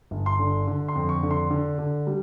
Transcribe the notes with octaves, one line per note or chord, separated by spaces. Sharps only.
G1
C6
D3
D3
C6
F2
C#6
D3
C6
D3
D3
G3